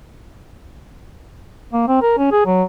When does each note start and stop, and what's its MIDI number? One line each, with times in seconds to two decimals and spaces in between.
1.73 1.85 58
1.88 1.99 60
2.02 2.17 70
2.18 2.28 61
2.32 2.42 68
2.46 2.64 54